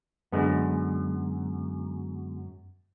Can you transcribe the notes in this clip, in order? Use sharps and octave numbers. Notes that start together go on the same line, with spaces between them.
F#2 D3 G#3 B3